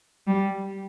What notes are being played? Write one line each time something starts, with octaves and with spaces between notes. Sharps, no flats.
G3